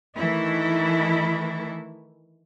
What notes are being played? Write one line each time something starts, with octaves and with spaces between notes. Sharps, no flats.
D#3 E3 A3 E4